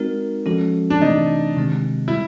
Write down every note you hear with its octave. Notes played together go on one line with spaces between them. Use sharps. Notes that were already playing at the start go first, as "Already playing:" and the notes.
Already playing: G#3 C4 D#4 F#4 A#4
F3 G#3 C#4 F#4 A4
D4
C3 E3 A3 C4 D#4
C3 D#3 G#3 C4
E4
G3